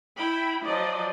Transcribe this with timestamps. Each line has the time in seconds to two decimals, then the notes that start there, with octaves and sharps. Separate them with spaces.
0.18 E4 G5 B5
0.64 F3 F#3 D5 D#5